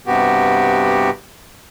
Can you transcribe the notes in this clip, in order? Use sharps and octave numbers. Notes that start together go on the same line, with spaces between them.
G2 C3 B3 F#4 G4